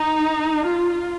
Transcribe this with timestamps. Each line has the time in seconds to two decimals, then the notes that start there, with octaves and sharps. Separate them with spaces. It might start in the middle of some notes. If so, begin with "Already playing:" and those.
Already playing: D#4
0.65 F4